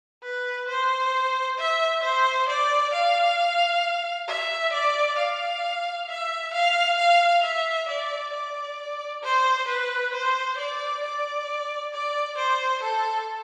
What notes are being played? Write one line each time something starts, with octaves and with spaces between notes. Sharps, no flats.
B4
C5
E5
C5
D5
F5
E5
D5
F5
E5
F5
F5
E5
D5
D5
C5
B4
C5
D5
D5
D5
C5
A4